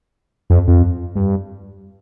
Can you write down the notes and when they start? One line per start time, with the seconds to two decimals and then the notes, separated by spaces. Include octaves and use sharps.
0.50 F2
0.68 F2
1.16 G2